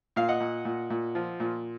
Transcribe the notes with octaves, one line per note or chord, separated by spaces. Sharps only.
A#2 F5
D#5 F#5
A#2
A#2
A#2
F3
A#2